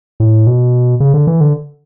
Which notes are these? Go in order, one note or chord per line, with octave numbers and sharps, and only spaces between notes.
A2
B2
C#3
D3
E3
D3